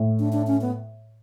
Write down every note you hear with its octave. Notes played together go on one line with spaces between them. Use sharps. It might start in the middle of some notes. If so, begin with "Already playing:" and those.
Already playing: A2
D4
D4
C#4
B3